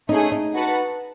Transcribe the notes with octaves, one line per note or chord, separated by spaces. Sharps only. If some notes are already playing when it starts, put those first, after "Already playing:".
A3 C#4 D#4 G#4
D#4
F#4 B4 F#5 A5